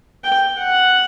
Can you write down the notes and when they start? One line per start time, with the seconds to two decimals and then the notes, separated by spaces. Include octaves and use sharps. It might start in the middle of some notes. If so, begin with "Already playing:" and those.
0.24 G5
0.58 F#5